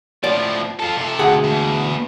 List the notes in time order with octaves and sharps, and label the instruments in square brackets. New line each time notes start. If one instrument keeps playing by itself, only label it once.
[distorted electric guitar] A2 F3 [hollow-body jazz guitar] D5
[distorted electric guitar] F4 A4
C3 A4
[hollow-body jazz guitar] D2 G#4 F#5
[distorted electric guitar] E2 B2